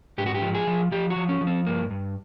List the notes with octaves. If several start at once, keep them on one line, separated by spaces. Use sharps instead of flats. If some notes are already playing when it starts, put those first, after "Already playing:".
G#2 G4
F#4
G4
F3
G#4
F3
F3 G4
F#4
F3
C#4
F3
C4
G2 A#3
G2